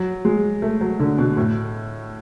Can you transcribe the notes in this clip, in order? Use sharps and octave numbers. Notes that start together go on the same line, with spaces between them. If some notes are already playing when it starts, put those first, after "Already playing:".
Already playing: F#3
G#3
A3
F#3
D3
B2
A2